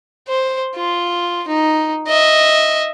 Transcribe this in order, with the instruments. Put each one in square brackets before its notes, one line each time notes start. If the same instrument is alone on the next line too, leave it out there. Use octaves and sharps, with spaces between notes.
[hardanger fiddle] C5
F4
D#4
D#5 E5